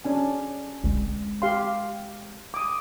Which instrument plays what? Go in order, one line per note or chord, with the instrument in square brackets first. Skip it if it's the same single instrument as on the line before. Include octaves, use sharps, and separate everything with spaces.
[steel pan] C#4 D4 G#5
[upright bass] G#3 C4
[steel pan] G4 F5 C6
D6 D#6